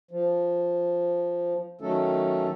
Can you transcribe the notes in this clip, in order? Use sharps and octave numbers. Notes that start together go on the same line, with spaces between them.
F3
D#3 F#3 A3 C#4 A4